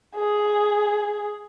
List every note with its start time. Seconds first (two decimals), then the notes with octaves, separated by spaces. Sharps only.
0.16 G#4